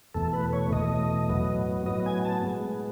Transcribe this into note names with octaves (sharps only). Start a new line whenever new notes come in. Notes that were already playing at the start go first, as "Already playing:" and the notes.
E2 B2 A3 A4
B4
C#5
E2 B2 A3 D#5
A2 F#3 B3
A2 F#3 B3 D#5
G#5
A5
A2 G#3 B3